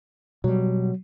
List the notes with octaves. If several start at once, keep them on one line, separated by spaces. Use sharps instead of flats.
B2 F#3 G3